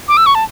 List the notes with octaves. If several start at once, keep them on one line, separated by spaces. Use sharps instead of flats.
D6
E6
C#6
A5